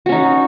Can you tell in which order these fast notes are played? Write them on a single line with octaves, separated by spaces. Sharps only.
F#4 C#4 D#4